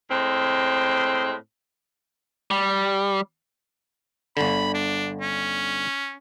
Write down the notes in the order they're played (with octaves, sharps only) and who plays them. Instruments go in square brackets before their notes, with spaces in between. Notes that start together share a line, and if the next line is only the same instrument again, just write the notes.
[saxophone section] A2 G#3 C4
[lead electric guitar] G3
[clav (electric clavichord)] G1 D3 [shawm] B5
[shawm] D4
C#4